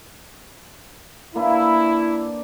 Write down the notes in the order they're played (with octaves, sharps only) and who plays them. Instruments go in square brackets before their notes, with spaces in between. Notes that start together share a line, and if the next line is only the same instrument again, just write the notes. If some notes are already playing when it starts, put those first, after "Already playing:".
[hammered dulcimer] A#3 D4 B4 [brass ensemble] E4